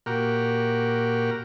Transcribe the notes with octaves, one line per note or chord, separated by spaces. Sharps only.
A#2 F#4 G4 A#4